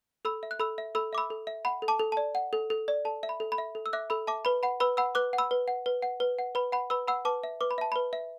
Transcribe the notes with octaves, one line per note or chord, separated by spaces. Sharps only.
A4 B5 E6
E5
F#6
A4 B5 E6
E5
A4 B5 E6
E5 D6
B5 E6
A4
E5
F#5 B5
A4
A5 D6
A4
D5 A5
F#5
A4
A4
D5
A4 A5
E5
B5
A4
B5
E5
A4
E6
E5 D6 F#6
A4 B5 E6
E5 A5 D6
B4 B5
F#5 B5
B4 B5 E6
F#5 B5 E6
B4 D6 F#6
F#5
B5 E6
B4
F#5
B4
F#5
B4
F#5
B4 B5
F#5 B5
B4 B5 E6
F#5 B5 E6
B4 A5 D6
E5
B4 D6
B5
E5 A5
B4 B5
E5